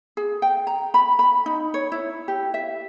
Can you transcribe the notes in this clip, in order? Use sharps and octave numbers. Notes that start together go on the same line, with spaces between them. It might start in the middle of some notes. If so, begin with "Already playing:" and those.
G#4
G5
A#5
B5
B5
D#4
C#5
E4
G4
E5